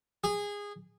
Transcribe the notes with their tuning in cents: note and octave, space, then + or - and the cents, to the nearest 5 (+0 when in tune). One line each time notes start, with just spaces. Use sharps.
G#4 -20